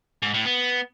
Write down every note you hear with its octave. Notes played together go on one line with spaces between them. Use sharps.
G#2
A2
B3